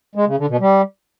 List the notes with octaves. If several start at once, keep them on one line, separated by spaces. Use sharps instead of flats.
G#3
C#3
D3
B2
G3